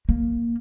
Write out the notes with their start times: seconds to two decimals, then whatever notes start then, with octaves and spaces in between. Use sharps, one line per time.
0.09 A#3